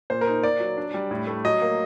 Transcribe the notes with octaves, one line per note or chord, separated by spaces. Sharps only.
A#2 C5
A#4
D#4
A#3 D5
F#3
D4
G3
A2
A3
F#3 D#5
A#3